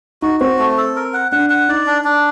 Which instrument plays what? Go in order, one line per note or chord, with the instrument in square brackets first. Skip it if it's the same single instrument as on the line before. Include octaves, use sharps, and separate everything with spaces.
[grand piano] D#4 [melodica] F#4
[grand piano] C4 [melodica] F#4
[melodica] A3
A4
A#4
F#5
[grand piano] D4 [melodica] F#5
[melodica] F#5
[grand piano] D#4 [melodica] D5
[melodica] D4
D4